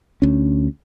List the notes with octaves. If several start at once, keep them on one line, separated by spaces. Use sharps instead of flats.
D2 C#4